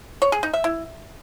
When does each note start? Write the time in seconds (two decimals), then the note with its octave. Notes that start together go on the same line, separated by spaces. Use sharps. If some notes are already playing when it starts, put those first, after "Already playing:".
0.22 C#5
0.32 G#4
0.43 D#4
0.53 E5
0.64 E4